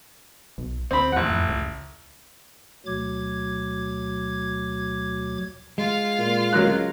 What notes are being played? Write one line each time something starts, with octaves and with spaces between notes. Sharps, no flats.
B1
D2 C4 B5
A1 E2 F#5
F2
C#2
D2 B2 F#3 D6 G#6
G#3 F4 F5
A#2
C#2 F#3 A#4 F#6